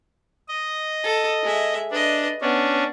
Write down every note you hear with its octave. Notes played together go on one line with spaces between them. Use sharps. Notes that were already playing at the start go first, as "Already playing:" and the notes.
D#5
A4
G#3 E5
D4 B4 D#5
B3 C#4 D4